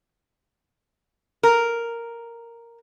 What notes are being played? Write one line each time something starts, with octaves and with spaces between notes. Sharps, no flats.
A#4